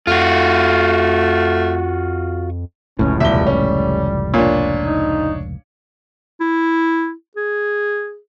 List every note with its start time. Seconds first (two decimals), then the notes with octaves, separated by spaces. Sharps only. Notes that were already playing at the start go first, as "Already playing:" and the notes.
0.07 F2 A3 F4 F#4
2.99 F1 C#2 A2 C#4
3.20 E1 G3 E5 G7
3.47 C#4
4.34 A#2 D4 C#5
4.85 D#4
6.40 E4
7.37 G#4